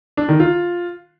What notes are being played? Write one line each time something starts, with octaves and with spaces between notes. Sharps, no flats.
D4
D#3
F4